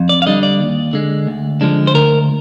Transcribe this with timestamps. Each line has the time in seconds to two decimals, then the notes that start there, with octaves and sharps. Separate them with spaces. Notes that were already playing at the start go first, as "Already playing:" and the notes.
Already playing: F2
0.09 D5
0.22 F5
0.26 D3 G3 D4 D#5
0.43 D5
0.60 D#2
0.93 D3 G#3
1.27 D2
1.61 D3 F3 G#3 D4
1.87 C5
1.94 D2 A#4